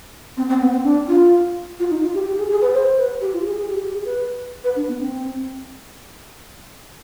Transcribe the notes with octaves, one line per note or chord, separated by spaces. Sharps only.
C4
C4
B3
C4
D4
F4
F4
D#4
F4
G4
G4
G#4
G#4
B4
C5
B4
G4
F4
G#4
G#4
G4
G4
G#4
B4
B4
D4
B3
C4